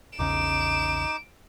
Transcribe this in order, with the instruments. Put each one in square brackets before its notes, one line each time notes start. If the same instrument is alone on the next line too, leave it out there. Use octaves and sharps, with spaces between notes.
[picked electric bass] A#1 E2 C#3 [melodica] D#4 D6 [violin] D7 E7